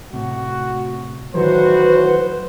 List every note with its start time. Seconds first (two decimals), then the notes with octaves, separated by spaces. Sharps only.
0.13 A2 C3 F#4
1.34 A2 D#3 E3 F#3 F#4 B4 C5